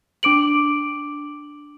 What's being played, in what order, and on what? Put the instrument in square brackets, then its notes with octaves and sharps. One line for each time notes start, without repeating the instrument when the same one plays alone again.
[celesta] D4 D6 D7 F#7